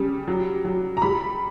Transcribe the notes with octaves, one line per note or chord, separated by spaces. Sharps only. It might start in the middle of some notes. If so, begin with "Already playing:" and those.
Already playing: C#3 G3
F#3
F#3
A#5
G3 B5